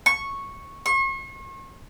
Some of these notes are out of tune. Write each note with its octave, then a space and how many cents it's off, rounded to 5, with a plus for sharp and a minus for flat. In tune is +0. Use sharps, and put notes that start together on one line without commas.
C#6 -5
C#6 -40